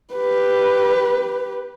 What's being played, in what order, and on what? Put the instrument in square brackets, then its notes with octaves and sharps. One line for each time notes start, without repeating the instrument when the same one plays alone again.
[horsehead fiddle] G4 B4